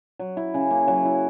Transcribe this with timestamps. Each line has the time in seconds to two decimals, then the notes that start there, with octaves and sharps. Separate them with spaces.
0.19 F#3
0.37 E4
0.54 C#3
0.70 A#3
0.88 F#3
1.05 E4